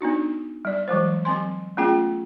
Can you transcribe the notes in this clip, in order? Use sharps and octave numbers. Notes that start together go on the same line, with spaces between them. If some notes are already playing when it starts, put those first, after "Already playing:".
B3 D4 D#4 F#4
G3 D5
E3 F#3 G#3 C5
F#3 C4 G#5 C6
A3 B3 C#4 F4 G#4 G5